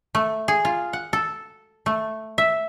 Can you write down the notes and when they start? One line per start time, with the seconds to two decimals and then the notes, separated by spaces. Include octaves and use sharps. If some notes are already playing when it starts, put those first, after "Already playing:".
0.15 A3
0.48 G#4
0.65 F4
0.93 F#5
1.13 A4
1.86 A3
2.38 E5